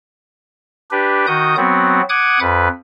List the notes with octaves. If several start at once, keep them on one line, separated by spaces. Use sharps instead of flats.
D4 G4 B4
D#3 F#4 D#6 G6
F#3 B3 C4 F#4
F#5 D6 D#6 F#6 G#6
F2 B4